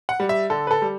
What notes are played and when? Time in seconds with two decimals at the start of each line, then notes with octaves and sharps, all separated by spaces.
0.09 F#5
0.20 G3
0.29 E5
0.50 D3 A4
0.67 B4
0.71 A4
0.82 G3